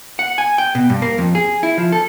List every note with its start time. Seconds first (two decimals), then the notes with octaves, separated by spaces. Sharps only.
0.19 F#5
0.38 G#5
0.58 G5
0.75 B2
0.90 G2
1.02 A#3
1.18 F2
1.35 G#4
1.63 E4
1.78 F3
1.92 A4